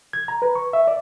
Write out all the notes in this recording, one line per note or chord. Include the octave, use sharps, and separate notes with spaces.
G#6
A#5
B4
C#6
E5
D5